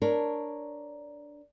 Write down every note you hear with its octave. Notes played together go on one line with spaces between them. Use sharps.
D4 A#4 C#5